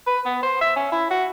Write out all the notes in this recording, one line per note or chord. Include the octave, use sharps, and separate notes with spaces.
B4
B3
C5
E5
C#4
E4
F#4